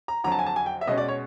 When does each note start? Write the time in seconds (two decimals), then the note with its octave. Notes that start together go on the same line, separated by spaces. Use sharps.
0.08 A#5
0.24 F2 D3 F#3 A#5
0.32 A5
0.39 G#5
0.46 A5
0.56 G#5
0.66 G5
0.81 E5
0.87 B2 G#3 C#4 D#5
0.98 D5
1.09 C#5